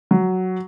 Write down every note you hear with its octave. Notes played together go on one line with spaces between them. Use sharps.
F#3